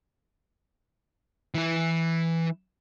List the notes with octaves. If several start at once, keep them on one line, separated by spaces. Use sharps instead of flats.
E3 E4